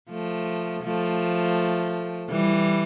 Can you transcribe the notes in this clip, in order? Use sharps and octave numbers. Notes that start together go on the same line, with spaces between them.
F3 A3
F3 A3
E3 G3